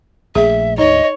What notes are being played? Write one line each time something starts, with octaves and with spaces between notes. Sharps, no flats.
A#1 A3 G#4 E5
D2 G#2 D#4 C#5 D#5